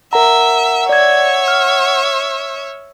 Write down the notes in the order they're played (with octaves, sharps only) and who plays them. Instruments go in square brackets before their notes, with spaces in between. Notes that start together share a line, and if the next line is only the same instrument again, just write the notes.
[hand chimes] A#4 A#5 [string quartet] E5 [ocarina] F#5
[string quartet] C#5 E5 [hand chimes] D5 G#6
[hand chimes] F6